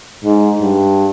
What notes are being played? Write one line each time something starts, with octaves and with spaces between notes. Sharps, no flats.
G#2
G2